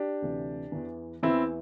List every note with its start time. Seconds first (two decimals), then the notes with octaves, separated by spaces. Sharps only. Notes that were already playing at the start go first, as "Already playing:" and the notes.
Already playing: D4 G4
0.22 D2 C3 E3
0.72 E2 E3
1.23 E2 E3 C4 E4